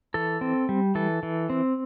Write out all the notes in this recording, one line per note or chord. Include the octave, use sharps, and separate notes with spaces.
E3 A4
C4
G3
E3 A4
E3
C4